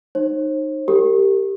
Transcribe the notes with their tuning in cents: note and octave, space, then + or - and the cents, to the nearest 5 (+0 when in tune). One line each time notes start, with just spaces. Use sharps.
D#4 -20 C5 +45
G4 +0 A#4 -30